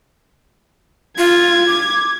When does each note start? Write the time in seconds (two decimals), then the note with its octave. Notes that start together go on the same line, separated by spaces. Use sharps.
1.18 F4 G#6
1.67 D6